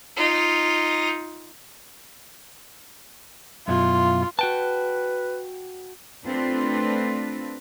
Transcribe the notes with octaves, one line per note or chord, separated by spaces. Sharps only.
D#4 F4
F#2 B2 E4 F4
F#4 B4 G5 A5
A3 C4 D4 F4 A4 B4